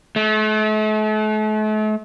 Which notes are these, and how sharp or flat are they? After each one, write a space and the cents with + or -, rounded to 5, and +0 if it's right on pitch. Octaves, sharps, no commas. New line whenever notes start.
A3 -40